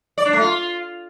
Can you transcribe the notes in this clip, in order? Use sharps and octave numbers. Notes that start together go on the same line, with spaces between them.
D5
D4
A3
F4